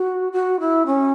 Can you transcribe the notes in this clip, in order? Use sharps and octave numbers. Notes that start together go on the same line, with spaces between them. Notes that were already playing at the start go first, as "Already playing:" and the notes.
Already playing: F#4
F#4
E4
C#4